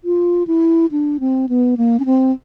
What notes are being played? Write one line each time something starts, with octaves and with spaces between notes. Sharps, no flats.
F4
E4
D4
C4
B3
A#3
C#4
C4